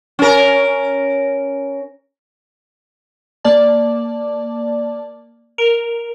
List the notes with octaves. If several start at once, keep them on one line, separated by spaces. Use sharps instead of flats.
C#4 A#4
A#3 D5 A5
A#4